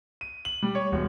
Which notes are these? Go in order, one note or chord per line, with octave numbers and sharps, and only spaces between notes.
D#7
F#7
G3
C#5
E1